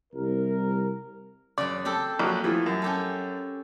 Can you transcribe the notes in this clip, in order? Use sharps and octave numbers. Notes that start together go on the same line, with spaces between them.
C2 A#4
F#2 C#3 D5
C4 G4 A4
A#1 F#3
E3 F3 A3 B5
F#2
C#4 G4 A4